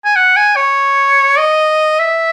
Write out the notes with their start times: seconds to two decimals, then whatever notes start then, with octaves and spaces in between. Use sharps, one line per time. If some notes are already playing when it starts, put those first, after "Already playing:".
0.05 G#5
0.16 F#5
0.36 G#5
0.56 C#5
1.38 D#5
1.99 E5